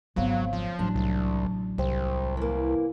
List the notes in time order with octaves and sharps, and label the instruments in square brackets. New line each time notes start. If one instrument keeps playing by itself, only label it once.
[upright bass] G#1 B3 [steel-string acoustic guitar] F2 C#3 [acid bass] F#3
[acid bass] F3
[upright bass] A1 F#3 [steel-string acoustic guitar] D4
[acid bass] C2
[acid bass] C2 [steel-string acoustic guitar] G4 C5
[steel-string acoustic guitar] E3 A#3